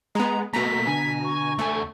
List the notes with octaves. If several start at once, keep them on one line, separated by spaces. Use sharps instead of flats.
G#3 B3 A#5
B2 A3 A#3 A#5 B6
D3 G#5
C#6
D2 A3 G#5